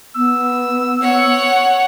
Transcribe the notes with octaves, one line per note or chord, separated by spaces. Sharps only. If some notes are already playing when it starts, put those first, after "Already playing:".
B3 E6
C#5 F#5